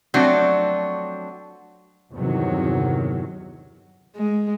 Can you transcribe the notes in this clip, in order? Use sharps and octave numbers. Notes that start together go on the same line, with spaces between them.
F3 F#3 A3 C4 D4 F#4
G1 E2 C3 D#3 F#3
G#3